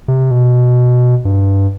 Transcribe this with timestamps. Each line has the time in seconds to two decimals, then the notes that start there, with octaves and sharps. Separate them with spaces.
0.08 C3
0.31 B2
1.25 G2